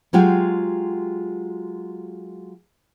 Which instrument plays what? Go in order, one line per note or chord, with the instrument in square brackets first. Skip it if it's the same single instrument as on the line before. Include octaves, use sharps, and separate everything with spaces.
[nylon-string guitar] F#3 G#3 F4 G4 G5 G#5